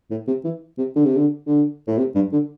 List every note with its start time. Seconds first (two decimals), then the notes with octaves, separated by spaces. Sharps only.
0.11 A2
0.27 C3
0.44 E3
0.78 C3
0.96 D3
1.06 C3
1.17 D3
1.47 D3
1.87 A2
1.98 C3
2.15 G2
2.32 D3